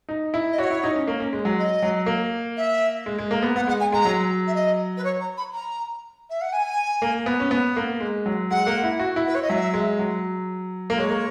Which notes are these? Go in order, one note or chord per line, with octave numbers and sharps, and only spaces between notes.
D#4
E4
D#5
F#4 C#5
E4
D#4
C#4
A#3
C#4
G#3
F#3
D#5
F#3
A#3
E5
G#3
G#3
A#3
B3
B3 F#5
G#3 F#5
G#5
G#3 A#5
F#3
E5
D#5
B4
C#5
A#5
B5
A#5
E5
F#5
G#5
A#3
B3
C#4
B3
A#3
G#3
F#3
G#3 F#5
A#3
E4
F#4
E4
B4
C#5
D#5
F#3 E5
G#3
F#3
A#3
G#3 C#5
A#3